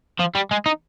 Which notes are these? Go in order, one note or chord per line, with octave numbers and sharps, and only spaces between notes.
F3
G3
G#3
D#4